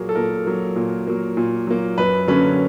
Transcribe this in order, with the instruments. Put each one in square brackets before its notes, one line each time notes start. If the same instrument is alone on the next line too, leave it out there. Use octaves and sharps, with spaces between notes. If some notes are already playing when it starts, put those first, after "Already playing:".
Already playing: [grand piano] A#2 F#3 A#3 G#4
A4
A#2 A#4
F#3 A#3
A#2
F#3 A#3
A#2
F#3 A#3
F#2 B4
D3 F#3 A#3 C#4 B4